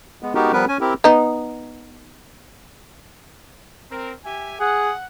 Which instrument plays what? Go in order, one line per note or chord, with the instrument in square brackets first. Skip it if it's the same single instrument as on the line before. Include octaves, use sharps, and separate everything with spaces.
[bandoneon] G#3 B3
G#3 B3 D#4 F#4 G4 A#4
F3 G3 B3 A#4 B4
C#4 G#5
C4 E4 G4 A#4
[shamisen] B3 D#4
[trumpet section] C4 A#4
G4 E5 G#5
[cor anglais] G#4 [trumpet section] F#5